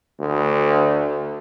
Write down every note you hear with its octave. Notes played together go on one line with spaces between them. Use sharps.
D2